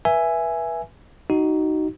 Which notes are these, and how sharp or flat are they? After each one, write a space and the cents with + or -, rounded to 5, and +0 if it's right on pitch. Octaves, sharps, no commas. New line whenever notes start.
B4 -30 E5 +10 G#5 +0
D#4 +0 F#4 +25